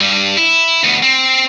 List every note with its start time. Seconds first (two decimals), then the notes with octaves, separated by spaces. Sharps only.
0.01 G2 G3
0.37 E4
0.84 D2 B3
1.03 C4